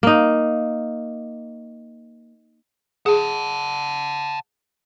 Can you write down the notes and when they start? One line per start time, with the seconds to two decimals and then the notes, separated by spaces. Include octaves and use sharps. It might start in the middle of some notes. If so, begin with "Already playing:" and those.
0.03 A#3 D#4
3.06 G#4 F#5 A5